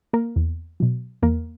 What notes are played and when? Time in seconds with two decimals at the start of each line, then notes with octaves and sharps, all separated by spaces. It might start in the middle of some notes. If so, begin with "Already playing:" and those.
0.13 A#3 A#4
0.36 E2
0.80 B2 F#3
1.22 E2 A#3 A#4